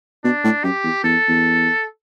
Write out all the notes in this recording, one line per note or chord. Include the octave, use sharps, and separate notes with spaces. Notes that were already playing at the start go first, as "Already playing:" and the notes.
B2 D4
A2
F#2 G4
E2
E2 A4
E2